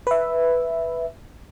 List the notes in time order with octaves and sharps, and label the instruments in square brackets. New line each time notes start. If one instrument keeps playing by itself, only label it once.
[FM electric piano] B4 E5